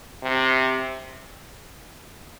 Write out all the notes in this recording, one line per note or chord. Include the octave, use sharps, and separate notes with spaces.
C3